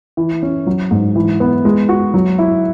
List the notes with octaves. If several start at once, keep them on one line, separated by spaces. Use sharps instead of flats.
E3
C#4
F#3
G#2
E3
B3
G#3
F#4
F#3
E4